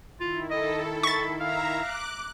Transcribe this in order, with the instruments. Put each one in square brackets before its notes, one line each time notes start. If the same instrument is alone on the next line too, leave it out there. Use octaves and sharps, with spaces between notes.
[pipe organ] D#3 E4 [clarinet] F4
[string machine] A4 [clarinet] D#5
[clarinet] B5 [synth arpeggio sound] C#6 A6
[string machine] E5 A#5 [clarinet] F5
[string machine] D6 F#6